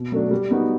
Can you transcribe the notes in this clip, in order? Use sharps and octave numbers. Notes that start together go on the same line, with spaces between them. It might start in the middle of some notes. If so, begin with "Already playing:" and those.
Already playing: B2
F#3 A3 D4
G3
B3 D#4 F#4